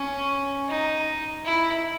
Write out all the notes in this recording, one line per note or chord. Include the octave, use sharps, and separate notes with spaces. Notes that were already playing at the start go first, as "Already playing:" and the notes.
Already playing: C#4
D#4
E4